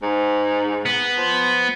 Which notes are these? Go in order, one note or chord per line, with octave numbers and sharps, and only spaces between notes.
G#2
B3
F3